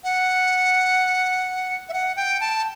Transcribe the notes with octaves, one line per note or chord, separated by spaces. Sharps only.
F#5
E5
F#5
G5
A5